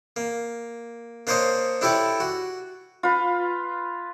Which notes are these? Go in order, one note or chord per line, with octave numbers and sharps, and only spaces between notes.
A#3
A#3 D4 C5 C#5 D#5
D4 E4 G4 A4 C#5 D5
F#4
F4 B4